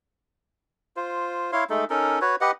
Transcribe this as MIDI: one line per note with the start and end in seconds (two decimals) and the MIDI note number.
0.96 1.51 65
0.96 1.51 72
1.52 1.64 64
1.52 1.64 73
1.52 1.64 77
1.52 1.64 84
1.70 1.85 56
1.70 1.85 57
1.70 1.85 63
1.70 1.85 69
1.90 2.19 61
1.90 2.19 63
1.90 2.19 69
1.90 2.19 70
2.21 2.36 66
2.21 2.36 71
2.21 2.36 73
2.41 2.51 67
2.41 2.51 71
2.41 2.51 75
2.41 2.51 78